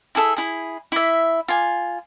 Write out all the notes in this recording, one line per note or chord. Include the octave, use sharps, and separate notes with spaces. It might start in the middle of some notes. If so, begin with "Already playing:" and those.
E4 G#4 A4 E5
E4 G#4
E4 E5
F4 G#5